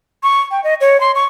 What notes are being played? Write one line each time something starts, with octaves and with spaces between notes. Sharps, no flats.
C#6
G5
D#5
C#5
C6
C#6